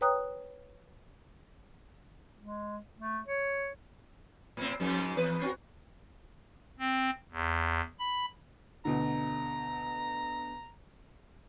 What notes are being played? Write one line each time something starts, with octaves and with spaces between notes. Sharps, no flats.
B4 C#5 G5 A#5 D#6 F#6
G#3
A3
C#5
A2 C4
F2 G#2 G#3
E2 B4
C4 D4 F#4
C4
E2
B5
D2 B2 D3 A#5